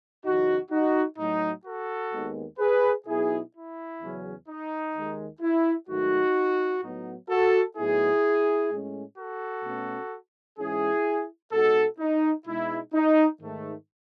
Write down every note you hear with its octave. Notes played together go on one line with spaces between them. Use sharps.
F#2 C#3 E3 D#4 F#4
D#4 F#4
A2 F#3 A3 D#4
F#4 A4
D#2 D#3 G#3 B3
G#4 B4
B2 F#3 B3 D#4 E4 G#4
E4
E2 C#3 F#3 C#4
D#4
D#2 D#3 G#3
E4
G#2 D#3 F#3 A3 D#4 F#4
A2 F#3 B3 D#4
F#4 A4
A2 F#3 B3 D#4 E4 G#4
A2 G#3 C#4
F#4 A4
B2 A3 C#4
G#2 E3 G#3 C#4 E4 G#4
B2 G#3 D#4 F#4 A4
D#4
B2 G#3 D#4 E4
D#4
G#2 D#3 A3